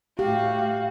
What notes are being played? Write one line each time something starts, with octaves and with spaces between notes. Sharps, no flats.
A2 F#4 G4 F5